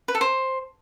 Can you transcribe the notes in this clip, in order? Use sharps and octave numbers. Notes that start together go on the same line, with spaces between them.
B4
A4
C5